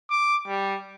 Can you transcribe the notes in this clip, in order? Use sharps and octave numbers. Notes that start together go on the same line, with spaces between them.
D6
G3